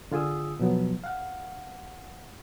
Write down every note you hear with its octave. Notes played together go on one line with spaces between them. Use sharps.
D3 F4 G#4 D#6 E6
B2 F3 F#3 B3
F5 F#5